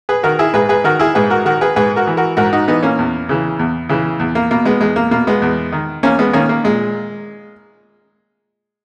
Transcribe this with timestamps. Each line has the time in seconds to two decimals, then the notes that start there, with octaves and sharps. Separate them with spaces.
0.09 G#4 B4
0.23 D#3 F#4 A#4
0.39 E4 G#4
0.54 G#2 G#4 B4
0.69 G#4 B4
0.84 D#3 F#4 A#4
0.99 E4 G#4
1.15 G#2 G#4 B4
1.30 F#4 A#4
1.45 D#3 F#4 A#4
1.61 G#4 B4
1.76 G#2 G#4 B4
1.96 F#4 A#4
2.07 E3
2.17 F#4 A#4
2.37 G#2 F#4 A#4
2.53 D#4 F#4
2.68 E3 B3 D#4
2.82 A#3 C#4
2.99 E2
3.29 C#3 E3
3.59 E2
3.89 C#3 E3
4.20 E2
4.35 A#3
4.51 B2 A#3
4.65 G#3 B3
4.81 E2 G#3
4.96 A#3
5.11 B2 A#3
5.27 G#3 B3
5.42 E2
5.72 D#3
6.03 E2 A#3 C#4
6.19 G#3 B3
6.33 D#3 A#3 C#4
6.49 A#3
6.64 A#2 G#3